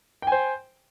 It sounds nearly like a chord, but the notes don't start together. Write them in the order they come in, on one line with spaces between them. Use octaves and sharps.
G5 G#5 C5